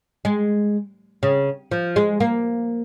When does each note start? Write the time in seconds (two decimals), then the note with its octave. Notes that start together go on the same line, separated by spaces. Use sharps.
0.25 G#3
1.23 C#3
1.71 F3
1.96 G#3
2.20 A#3